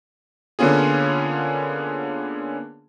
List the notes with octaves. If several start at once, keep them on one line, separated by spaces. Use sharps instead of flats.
D3 A#3 B3 C#4 F4 G#4